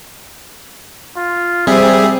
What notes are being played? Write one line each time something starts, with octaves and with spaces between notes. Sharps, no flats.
F4
G3 C4 G#4 E5